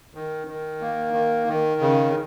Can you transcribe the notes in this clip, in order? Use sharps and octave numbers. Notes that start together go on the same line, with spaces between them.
D#3
D#3
A#3
D#3
D#3
C#3